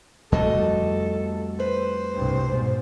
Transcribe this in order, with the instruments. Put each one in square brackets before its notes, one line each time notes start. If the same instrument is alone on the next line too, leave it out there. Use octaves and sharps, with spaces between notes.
[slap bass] F2 G3 A3 [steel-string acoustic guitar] F#4 D#5 A5 [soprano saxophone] A4
[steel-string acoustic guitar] B4 [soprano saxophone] C5
[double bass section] C2 G2
G#2 B2